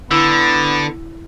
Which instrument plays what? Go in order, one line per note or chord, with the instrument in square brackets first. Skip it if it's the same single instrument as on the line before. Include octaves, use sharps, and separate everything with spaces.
[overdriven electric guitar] D3 [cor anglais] B3 [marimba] E4